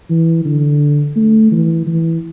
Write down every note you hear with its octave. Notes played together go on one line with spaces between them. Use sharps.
E3
D3
A3
E3
E3